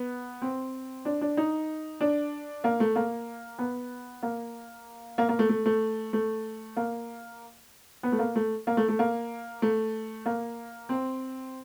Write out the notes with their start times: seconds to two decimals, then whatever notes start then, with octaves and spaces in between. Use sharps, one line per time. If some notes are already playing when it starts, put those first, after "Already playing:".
Already playing: B3
0.42 C4
1.05 D4
1.21 D4
1.37 D#4
2.01 D4
2.64 A#3
2.80 A3
2.96 A#3
3.59 B3
4.23 A#3
5.18 A#3
5.29 A#3
5.39 A3
5.49 A3
5.66 A3
6.13 A3
6.77 A#3
8.03 B3
8.12 A3
8.19 A#3
8.36 A3
8.67 A#3
8.77 A3
8.88 A3
8.99 A#3
9.62 A3
10.26 A#3
10.89 C4